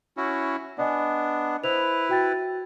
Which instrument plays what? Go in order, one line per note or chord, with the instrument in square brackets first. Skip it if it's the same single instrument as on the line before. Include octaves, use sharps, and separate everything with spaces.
[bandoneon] C#4 E4 F#4
[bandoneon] B3 D4 [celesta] D5 D#5 G#5
[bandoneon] E4 B4 [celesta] C5 F7
[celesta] F#4 G5 A6